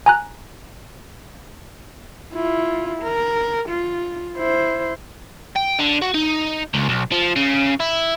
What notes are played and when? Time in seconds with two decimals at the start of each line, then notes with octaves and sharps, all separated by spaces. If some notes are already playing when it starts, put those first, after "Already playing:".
0.06 G#5 A#5 F#6
2.33 E4 F4
3.03 A#4
3.70 F4
4.36 E4 C5
5.56 G5
5.79 D3
6.02 F#4
6.14 D#4
6.74 C#2
6.89 B1
7.12 F3
7.36 C#3
7.80 E4